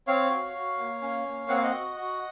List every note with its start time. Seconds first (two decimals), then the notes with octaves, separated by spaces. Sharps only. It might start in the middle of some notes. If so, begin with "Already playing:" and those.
0.07 C4 C#5 F5
0.30 F#4
0.55 F#4
0.78 A#3
1.02 C#4
1.25 A#3
1.49 C4 F#5
1.56 F5
1.63 D#5 F#5
1.73 F#4
1.96 F#4